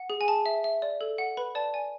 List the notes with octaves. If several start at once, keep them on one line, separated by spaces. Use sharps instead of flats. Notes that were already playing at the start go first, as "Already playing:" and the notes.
Already playing: F#5
G#4
G#5
G#4 A5
E5
E5
D5
A4
F#5
B4 B5
D5 A5
D5 G#5